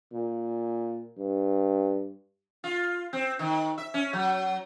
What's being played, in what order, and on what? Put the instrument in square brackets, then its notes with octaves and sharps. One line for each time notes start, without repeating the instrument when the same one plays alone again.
[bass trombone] A#2
G2
[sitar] F4
C4
D#3
E5
C#4
F#3